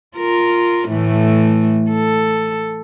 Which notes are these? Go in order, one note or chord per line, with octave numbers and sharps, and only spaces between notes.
F4 A#4
A2 E3 A3
A4